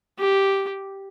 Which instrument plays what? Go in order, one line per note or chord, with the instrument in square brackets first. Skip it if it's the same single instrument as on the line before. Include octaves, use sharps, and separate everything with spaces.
[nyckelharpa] G4